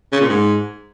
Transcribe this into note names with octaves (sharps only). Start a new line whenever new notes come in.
C#3
A#2
G#2